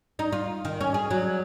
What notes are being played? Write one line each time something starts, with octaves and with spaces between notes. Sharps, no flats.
D#4
F4
D#3
C#4
G#4
F#3